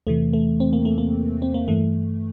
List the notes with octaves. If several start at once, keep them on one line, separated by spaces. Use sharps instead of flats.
E2 C3 E3 A3
A3
C4
A#3
A3
A#3
C4
A#3
G2 E3 A3